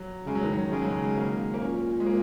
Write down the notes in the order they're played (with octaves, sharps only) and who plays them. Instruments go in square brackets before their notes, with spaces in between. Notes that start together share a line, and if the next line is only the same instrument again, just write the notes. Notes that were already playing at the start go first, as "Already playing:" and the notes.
Already playing: [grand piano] F#3
[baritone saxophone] C#3 [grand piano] G#3
[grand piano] F#3
D#3
F#3
[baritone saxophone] C#3 [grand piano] G#3
[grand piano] F#3
G#3
A#3
A#3
[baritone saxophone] A#2 [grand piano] C#4
[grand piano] G#3
A#3